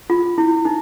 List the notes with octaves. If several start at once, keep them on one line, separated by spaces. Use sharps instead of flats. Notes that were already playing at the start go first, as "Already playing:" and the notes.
F4
E4
D#4